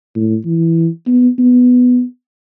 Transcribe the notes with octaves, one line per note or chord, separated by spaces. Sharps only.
A2
E3
B3
B3